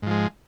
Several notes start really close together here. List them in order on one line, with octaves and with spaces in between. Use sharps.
G#2 F3 G#3